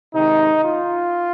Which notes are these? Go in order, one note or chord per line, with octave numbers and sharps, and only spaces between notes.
C3 D#3 G#3 D#4
F4